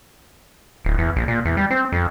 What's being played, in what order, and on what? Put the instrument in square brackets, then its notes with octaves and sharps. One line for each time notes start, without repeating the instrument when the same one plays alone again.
[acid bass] D1
E2
A#1
A#2
E2
G3
C4
F2